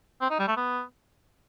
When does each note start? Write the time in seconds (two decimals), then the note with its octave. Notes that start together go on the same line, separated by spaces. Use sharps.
0.21 C4
0.30 D#4
0.39 G3
0.48 A3
0.57 B3